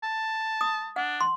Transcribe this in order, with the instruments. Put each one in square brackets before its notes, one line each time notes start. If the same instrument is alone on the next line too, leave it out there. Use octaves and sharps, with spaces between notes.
[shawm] A5
[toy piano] D#6
[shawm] D4 [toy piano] F#5
[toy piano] C6